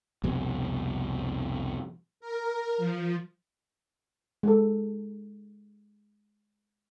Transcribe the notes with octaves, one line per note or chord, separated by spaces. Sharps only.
C2 F2 B2
A#4
F3
G#3 A4